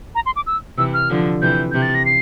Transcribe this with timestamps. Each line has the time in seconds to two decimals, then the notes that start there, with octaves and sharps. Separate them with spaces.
0.15 A#5
0.26 C6
0.36 D6
0.47 E6
0.78 C3 E3 E6
0.94 F6
1.10 D3 F3
1.42 C3 E3 G6
1.71 C3 G6
1.82 A6
1.95 A#6
2.06 C7